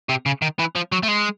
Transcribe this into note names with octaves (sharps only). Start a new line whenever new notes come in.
C3
C#3
D#3
E3
F3
F#3
A3
G#3